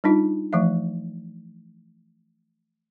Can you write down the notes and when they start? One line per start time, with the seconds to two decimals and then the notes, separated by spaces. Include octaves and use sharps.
0.04 G3 D4 D#4 F4
0.53 E3 F3 A3 E5